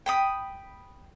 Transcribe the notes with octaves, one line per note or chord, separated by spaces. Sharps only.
G5 B5 D#6